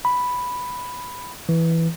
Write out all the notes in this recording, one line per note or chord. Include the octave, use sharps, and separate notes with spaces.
B5
E3